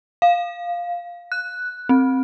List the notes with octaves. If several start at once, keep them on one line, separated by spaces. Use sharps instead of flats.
F5
F#6
C4